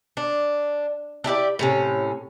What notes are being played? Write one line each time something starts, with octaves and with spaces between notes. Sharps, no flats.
D4
D4 E4 G4 D5
A2 C3 C#4